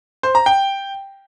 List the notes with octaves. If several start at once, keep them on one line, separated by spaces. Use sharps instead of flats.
C5
A#5
G5